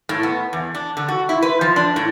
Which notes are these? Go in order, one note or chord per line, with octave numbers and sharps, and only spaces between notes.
A2
B3
E2
D4
D3
F#4
E4
B4
F3
D4
A2